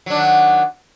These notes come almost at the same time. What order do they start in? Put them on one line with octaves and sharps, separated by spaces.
F#3 D4 D#3